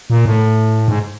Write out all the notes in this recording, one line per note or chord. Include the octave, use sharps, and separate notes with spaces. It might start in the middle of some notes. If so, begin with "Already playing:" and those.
A#2
A2
G#2